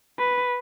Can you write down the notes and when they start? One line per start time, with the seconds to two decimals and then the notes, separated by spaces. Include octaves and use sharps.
0.19 B4